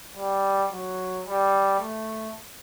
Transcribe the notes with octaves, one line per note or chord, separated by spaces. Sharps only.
G3
F#3
G3
A3